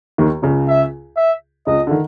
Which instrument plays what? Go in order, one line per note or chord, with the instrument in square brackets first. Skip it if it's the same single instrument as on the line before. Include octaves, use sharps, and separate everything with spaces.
[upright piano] D#2 D#3
C#2 C#3
[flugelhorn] E5
E5
[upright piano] C#2 C#3 [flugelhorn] D#5
[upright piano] D3
D#3